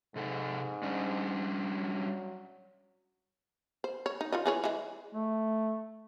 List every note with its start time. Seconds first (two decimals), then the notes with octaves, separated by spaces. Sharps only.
0.16 G#2 C3 A4
0.83 G3 C#4 D4
1.74 F#3
3.84 C5
4.06 C#5
4.21 D#4
4.32 F4 C#5 D#5
4.46 E3 G#4 C#5
4.64 E3 G#3
5.13 A3